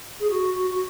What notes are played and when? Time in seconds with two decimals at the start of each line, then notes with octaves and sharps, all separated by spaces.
0.19 G#4
0.29 F#4
0.53 F#4
0.70 F#4